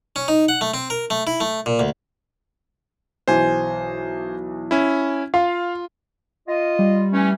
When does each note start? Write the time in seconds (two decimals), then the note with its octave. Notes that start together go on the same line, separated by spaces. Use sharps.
0.16 C#4
0.28 D#4
0.49 F#5
0.61 A3
0.74 C4
0.90 A#4
1.10 A3
1.27 E4
1.41 A3
1.66 A#2
1.79 D2
3.28 B1 E3 C5 G#5
4.71 C#4 E4
5.34 F4 F5
6.48 F4 D#5
6.79 G3
7.12 E3 A3 C#4